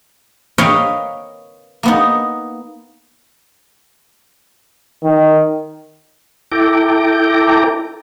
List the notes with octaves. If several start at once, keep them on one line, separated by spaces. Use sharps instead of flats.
A#4 B4 C#5 D#5 F5 G5
A#3 B3 D#4
D#3
E4 A4 G5 A#5 D6